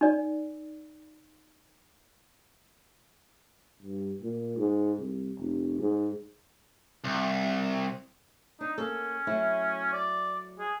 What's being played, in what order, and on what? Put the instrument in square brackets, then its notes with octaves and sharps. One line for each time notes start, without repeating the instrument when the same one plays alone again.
[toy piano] D#4 D5
[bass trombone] G2
A#2
G#2
C2
F1
G#2
[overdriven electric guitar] C2
[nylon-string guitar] D4 [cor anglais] D#4
[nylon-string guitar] A#3 A4 [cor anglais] C#4
[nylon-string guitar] F#3 A3 E4
[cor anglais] D5
G#4